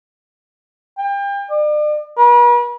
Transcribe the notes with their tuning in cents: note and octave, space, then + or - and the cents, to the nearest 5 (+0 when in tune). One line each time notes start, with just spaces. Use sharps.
G5 +35
D5 +40
B4 -45